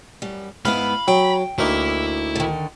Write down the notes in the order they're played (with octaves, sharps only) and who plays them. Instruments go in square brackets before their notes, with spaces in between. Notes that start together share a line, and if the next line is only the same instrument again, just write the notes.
[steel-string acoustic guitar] F#2 G3
[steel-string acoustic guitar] G#2 B3 E4 [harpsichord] F5 [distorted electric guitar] B5
[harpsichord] F#3 [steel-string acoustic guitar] G5
[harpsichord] D2 A#3 D#4 [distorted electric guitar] E4
[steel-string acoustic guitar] D3 D#3